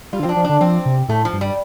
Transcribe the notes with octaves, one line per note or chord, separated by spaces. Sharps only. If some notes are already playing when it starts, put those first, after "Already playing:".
G3 F4
D3
F3 C4
D4
F3
D3 D4
F3 C4
C3
A2 A3
F3
G2
G3